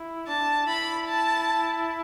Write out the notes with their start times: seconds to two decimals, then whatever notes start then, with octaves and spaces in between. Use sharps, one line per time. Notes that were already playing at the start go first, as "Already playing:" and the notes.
Already playing: E4
0.27 D4 A5
0.67 E4 B5
1.07 A5